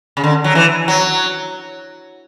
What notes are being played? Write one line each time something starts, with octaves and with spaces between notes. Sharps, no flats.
C#3
D3
F#3
E3
F#3